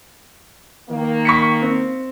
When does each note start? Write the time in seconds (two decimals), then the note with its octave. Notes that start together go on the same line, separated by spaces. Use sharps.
0.89 D#3 A#3
1.25 C#6 B6 C#7
1.62 C4